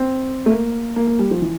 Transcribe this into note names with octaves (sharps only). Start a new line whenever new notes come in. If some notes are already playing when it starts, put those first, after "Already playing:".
Already playing: C4
A3
A#3
A#3
A#3
G3
F3
E3